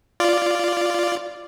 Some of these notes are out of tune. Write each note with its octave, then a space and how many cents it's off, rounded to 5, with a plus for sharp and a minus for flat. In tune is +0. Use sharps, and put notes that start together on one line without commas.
F4 -5 D5 +0